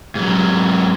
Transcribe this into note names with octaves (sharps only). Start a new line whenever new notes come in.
G#2 F#3